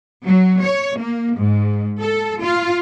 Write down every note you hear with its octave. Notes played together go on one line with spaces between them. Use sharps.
F#3
C#5
A#3
G#2
A4
F4